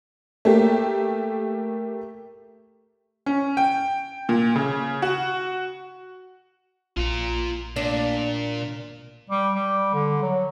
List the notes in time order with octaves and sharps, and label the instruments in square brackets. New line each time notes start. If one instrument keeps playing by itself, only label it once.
[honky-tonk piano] A3 A#3 G4
C#4
G5
A#2
C#3
F#4
[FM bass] A#1 [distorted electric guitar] F4 A#5
[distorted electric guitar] A#2 [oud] D4
[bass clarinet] G3
G3
D3
F#3